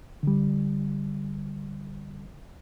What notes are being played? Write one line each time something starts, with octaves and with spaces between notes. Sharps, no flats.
D3 G3